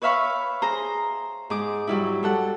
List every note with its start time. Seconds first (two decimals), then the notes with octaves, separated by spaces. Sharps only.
0.02 B4 C#5 E5 F5 B5 C#6
0.62 G#4 C5 A#5
1.50 G#2 G#4 D6
1.87 F#3 G3 E4
2.23 G3 A4 F#5